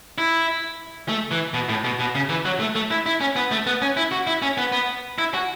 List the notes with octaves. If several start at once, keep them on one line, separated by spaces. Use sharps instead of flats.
E4
A3
E3
B2
A2
B2
B2
C#3
E3
F#3
A3
A3
E4
E4
C#4
B3
A3
B3
C#4
E4
F#4
E4
C#4
B3
B3
E4
F#4